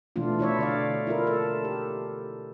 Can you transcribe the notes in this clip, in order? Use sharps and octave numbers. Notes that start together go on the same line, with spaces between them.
B2 E3 A3 D4 F4
D4 E4 C#5 E5
D3 D5 F5
E4 F4 A#4
A4
G4